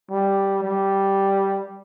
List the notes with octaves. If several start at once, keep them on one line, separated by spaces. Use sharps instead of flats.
G3
G3